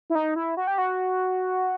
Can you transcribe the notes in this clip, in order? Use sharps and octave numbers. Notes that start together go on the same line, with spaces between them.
E4
D#4
E4
F#4
G4
F#4